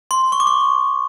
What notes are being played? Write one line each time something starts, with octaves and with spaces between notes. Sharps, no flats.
C6
C#6
D6
C#6